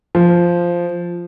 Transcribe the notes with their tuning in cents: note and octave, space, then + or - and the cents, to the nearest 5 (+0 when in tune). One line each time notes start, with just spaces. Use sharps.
F3 -5